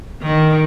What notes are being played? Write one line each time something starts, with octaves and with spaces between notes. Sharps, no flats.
D#3